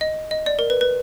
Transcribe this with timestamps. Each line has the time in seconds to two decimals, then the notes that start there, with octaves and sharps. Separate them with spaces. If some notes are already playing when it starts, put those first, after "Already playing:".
0.01 D#5
0.31 D#5
0.46 D5
0.59 A#4
0.70 B4
0.81 B4